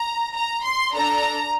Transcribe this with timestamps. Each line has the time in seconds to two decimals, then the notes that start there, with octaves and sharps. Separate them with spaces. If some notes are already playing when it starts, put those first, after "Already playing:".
Already playing: A#5
0.34 A#5
0.64 C6
0.94 D4 A4 A#5